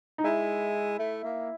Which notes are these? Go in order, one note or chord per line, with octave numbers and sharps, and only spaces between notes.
D#4
G#3 E4
A3
A#3